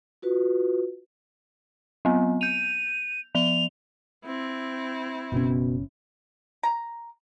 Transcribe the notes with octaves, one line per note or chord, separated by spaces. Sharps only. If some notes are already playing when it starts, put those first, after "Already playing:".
F4 F#4 B4
F#3 B3
G6 D#7 F7
F3 F7 G7
C4 E4
F#1 B2 C#4
A#5